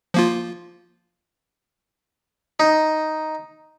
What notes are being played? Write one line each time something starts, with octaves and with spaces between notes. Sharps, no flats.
F3 A#3 F4
D#4